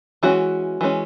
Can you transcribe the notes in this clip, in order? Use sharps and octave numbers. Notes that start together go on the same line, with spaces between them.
E3 G#3 C#4 F#4
E3 G#3 C#4